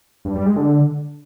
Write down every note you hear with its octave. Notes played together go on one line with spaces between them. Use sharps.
G2
G3
G#3
D3